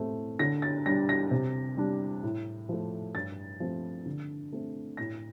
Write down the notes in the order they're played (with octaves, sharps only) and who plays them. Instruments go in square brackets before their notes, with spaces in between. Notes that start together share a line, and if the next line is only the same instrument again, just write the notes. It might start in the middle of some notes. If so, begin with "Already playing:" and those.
Already playing: [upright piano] A2 A3 C4
D3 A#6
A6
G3 D4 A#6
A#6
C3
G3 D4
A2
F3 A3
G2 A6
F3 A3 C4
D3
A3 C4
A2 A#6